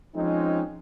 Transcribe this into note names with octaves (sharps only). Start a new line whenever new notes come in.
F3 G#3 C4 C#4 D#4